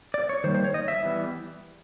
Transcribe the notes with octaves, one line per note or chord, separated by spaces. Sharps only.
D5
C#5
D#3 G3 A#3 C5
C5
C#5
D#5
E5
E3 G3 B3